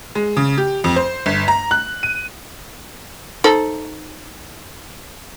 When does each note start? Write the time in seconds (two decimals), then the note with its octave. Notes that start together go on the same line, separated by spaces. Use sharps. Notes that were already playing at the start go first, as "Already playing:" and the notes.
0.15 G#3
0.37 C#3
0.58 G4
0.84 F2
0.96 C5
1.26 G1
1.48 A#5
1.71 F#6
2.03 D#7
3.44 D#4 A4 C5